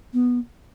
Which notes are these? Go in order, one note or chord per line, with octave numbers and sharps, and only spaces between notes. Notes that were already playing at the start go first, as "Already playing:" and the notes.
B3